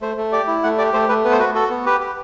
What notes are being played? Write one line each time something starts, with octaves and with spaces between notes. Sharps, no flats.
A3 C5
A3
G4 D5
E4
A3 F#5
G4 D5
A3 C5
A3 B4
B3 B4
C5
F#4 B4
F#4 A4
B3
G4 B4
G4